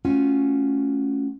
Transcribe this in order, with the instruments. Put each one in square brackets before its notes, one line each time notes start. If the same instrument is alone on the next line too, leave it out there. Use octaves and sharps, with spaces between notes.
[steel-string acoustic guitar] A3 C#4 F4 F#4 G#5